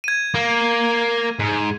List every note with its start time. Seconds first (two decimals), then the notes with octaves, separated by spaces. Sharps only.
0.04 G#6 D#7
0.35 A#3
1.40 G#2